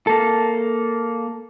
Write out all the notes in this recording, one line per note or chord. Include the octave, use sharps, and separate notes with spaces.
A#3 A4